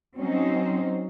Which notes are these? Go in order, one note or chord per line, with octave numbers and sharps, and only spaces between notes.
F#3 C4 C#4 D#4 C5